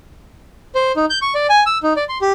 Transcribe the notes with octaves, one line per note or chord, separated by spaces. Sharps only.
C5
D#4
G6
C#6
D5
G#5
E6
D#4
D5
C6
G4